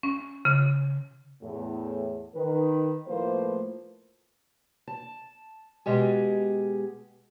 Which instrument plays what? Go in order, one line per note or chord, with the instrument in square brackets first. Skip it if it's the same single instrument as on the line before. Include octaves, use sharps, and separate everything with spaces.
[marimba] C#4
C#3
[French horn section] E2 A2
D#3 B4
A2 F3 A3 A#3 B4 C5
[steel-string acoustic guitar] A5
B2 G#3 G4 G#4